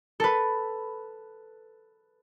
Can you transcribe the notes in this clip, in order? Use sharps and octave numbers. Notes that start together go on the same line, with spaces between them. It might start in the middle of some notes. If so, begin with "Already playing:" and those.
A4 B4